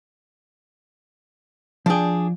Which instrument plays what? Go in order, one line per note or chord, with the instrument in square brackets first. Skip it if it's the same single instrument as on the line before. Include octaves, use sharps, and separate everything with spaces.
[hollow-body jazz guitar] F3 D5 G5 [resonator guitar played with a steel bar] D4 G#4